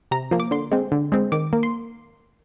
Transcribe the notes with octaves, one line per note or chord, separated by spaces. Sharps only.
C3 A#5
F3 A#3
D6
D3 C6
G#3 C4
D3
G#3 C4
D#3 D6
A#3
C6